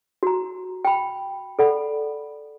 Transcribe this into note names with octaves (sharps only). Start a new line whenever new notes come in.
F#4 A#5
G5 B5
A4 D5 F#5 B5